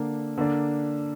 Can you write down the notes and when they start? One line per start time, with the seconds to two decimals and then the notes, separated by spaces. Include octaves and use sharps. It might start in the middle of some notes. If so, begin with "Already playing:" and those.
Already playing: D3 A#3 D4
0.38 D3 A#3 D4